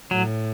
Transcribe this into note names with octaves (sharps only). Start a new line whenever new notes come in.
A2 F#3